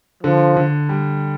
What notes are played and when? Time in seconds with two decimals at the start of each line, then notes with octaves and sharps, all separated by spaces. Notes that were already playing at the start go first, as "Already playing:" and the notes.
0.23 D3 F3
0.57 D3
0.89 G3